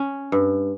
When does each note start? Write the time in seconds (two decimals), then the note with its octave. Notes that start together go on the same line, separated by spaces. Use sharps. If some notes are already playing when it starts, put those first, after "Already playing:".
Already playing: C#4
0.32 G2